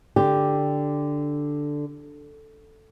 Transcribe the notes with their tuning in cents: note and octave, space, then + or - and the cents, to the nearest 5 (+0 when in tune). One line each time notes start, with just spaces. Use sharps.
D3 +0 G4 +0